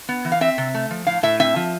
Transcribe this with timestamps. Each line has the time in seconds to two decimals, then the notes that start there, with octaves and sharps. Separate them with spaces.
0.09 B3
0.25 E3
0.32 F5
0.41 C4 E5
0.58 C3
0.75 A3
0.91 F3
1.07 A2 F5
1.23 A2 E5
1.40 C4 E5
1.56 F3